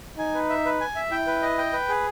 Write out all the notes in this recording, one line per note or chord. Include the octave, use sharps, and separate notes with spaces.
D#4 G#5
B4
E5
B4
G#5
E5
E4 G5
B4
D#5
G5
B4
G#4